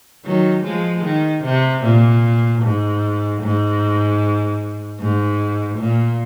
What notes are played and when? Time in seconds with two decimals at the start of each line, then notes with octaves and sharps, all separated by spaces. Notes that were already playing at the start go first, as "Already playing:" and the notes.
0.25 D#3 F#3
0.64 F3 G#3
1.04 D#3
1.44 C3
1.83 A#2
2.62 G#2
3.41 G#2
4.99 G#2
5.78 A#2